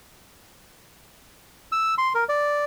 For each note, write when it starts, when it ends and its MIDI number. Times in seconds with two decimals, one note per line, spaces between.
1.72 1.94 88
1.98 2.13 84
2.15 2.24 70
2.29 2.65 74